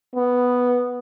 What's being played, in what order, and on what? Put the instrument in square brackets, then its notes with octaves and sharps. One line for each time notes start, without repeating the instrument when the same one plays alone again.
[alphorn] B3